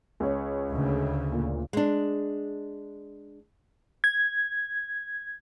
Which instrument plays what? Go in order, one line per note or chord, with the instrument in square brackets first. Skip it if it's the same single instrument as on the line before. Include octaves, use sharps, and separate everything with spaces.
[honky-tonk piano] C#2 C#5
[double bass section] D2 C#3
[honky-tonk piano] A#2
[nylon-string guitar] G#3 D4
[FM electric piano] G#6